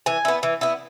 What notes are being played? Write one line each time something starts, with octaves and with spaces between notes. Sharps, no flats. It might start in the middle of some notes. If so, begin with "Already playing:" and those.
E3 G#5
B3 E4
E3
B3 E4